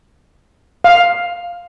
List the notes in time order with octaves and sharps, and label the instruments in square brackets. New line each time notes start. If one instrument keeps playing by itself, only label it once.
[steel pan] F5